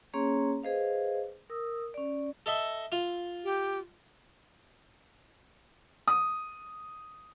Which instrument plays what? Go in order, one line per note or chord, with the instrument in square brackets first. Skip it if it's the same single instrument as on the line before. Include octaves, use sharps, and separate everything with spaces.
[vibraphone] A#3 C#4 G#4 C#5 A#5 C6
G#4 B4 C5 D#5 F5
A#4 D#6 E6
C#4 D5
[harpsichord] A4 D#5 E5
F4
[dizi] G4
[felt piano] D#6